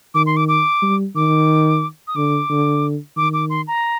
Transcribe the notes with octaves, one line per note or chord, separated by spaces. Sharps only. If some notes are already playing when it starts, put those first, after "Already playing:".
D#3 D6
C6
D6
D6
G3
D#3 D6
D#6
D3 D6
D3
D#3 D6
D6
C6
A#5